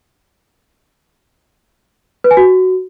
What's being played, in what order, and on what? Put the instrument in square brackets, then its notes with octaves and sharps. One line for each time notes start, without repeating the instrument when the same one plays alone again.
[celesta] B4
G#5
F#4